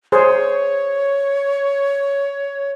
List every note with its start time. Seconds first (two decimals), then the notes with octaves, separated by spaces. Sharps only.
0.12 G#4 C5 C#5